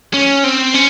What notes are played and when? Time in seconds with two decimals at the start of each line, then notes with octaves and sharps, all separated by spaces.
0.14 C#4
0.44 C4
0.74 C#4